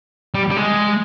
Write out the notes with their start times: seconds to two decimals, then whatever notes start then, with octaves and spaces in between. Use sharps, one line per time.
0.34 G3
0.50 G3
0.57 G#3